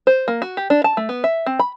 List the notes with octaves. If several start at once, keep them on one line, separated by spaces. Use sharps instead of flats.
C5
A#3
F#4
G4
D4
A5
A3
B3
E5
C4
B5